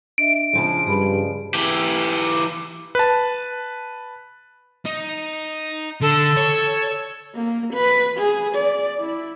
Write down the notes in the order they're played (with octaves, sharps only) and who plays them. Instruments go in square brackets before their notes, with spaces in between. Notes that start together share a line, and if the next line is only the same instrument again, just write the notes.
[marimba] D4 D#5 E5 [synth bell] D7
[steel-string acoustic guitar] C#3 F3 G#3
[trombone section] G2 [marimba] G#4 B5
[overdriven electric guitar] E3 G4
[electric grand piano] B4 A5
[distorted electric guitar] D#4
[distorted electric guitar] D3 [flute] A4
[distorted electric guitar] C#5
[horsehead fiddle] A#3
B4
G#4
D5
E4